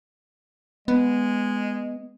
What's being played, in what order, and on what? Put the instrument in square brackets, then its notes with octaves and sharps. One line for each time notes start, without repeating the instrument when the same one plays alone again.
[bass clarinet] G#3 [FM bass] B3